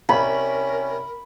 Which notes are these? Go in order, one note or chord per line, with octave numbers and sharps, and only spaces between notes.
C2 C#4 A#4 B5